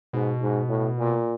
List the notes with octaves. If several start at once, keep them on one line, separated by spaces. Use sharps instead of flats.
G#2 B2
G#2
A2
A#2